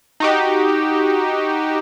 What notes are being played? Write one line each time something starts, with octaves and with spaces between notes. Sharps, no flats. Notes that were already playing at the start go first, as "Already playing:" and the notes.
D#4 F#4 G4